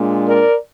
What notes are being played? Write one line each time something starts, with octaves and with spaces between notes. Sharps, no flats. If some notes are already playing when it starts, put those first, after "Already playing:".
Already playing: A#2 G#3 D4
A#4 D5